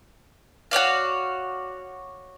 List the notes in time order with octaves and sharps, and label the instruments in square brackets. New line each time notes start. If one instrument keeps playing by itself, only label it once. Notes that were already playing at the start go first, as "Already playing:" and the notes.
[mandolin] F#4 C#5 D5 F5